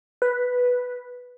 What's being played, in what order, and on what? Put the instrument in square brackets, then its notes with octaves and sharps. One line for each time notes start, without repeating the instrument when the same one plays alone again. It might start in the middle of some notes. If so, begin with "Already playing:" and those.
[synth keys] B4